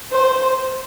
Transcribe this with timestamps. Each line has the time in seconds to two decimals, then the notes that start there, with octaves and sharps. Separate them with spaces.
0.12 C5